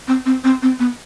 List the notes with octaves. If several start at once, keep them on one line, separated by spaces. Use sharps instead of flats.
C4
C4
C4
C4
B3